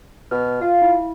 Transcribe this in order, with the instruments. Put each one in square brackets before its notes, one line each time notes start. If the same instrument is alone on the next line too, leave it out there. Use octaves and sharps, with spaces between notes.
[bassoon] B2 [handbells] F6
[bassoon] F4 [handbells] F5
[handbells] E4